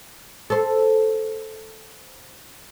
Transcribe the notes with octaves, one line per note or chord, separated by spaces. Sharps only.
A4 C5